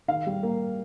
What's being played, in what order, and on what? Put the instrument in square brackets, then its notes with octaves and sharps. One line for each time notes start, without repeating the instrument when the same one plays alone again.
[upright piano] D#3 F5
G3
A#3